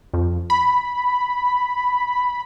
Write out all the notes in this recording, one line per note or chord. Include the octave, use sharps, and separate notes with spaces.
F2
B5